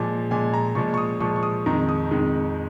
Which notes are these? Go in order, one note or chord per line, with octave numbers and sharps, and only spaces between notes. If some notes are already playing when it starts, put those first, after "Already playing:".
Already playing: A#2 F3 G#3 G#5
A#2 F3 G#3 G#5
A#5
A#2 F3 G#3 C#6
C#6
D#6
A#2 F3 G#3 C#6
C#6
D#6
F2 D#3 G#3 A#5
D#6
F2 D#3 G#3